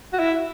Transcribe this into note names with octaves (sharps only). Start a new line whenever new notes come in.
F#4
E4